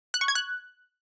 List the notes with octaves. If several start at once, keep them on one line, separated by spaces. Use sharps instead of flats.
F#6
C#6
G#6
F#6